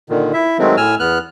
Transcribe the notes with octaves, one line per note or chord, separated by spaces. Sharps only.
A#2 D3 D#3
E4 E5
D#3 F#3 G#3 A3 C4
A2 G#5 E6 F6
E2 B3 F6 F#6